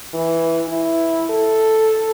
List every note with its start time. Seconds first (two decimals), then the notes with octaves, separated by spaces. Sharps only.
0.14 E3
0.68 E4
1.30 A4